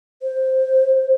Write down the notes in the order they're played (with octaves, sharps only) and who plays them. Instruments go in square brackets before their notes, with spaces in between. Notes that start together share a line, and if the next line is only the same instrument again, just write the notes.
[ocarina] C5